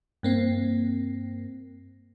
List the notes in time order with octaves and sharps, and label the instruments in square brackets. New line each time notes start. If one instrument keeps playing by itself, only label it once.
[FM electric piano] G2 A#3 C4